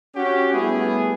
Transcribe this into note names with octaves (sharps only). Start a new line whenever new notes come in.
C#4 F#4 G4
G3 A3 B3 E4 G#4